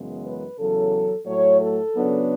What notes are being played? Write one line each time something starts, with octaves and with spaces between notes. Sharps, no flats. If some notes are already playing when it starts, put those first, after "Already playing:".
Already playing: F#2 C#3 E3 G#3 B3
B4
E2 C#3 F#3 A4
A2 F#3 A3 C#5
A4
C#3 F#3 B3 D4